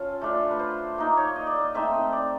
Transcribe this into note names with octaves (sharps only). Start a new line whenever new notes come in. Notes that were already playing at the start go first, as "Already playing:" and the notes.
Already playing: C#4 F4 A4
A3 D4 F4
B4
C5
A#3 D#4
C#5
D#5
D5
D#5
A3 C4 D#4 E5
D#5
D5